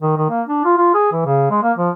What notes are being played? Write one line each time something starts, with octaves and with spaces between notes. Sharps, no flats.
D#3
D#3
A#3
D4
F4
F4
G#4
E3
C#3
G#3
A#3
F3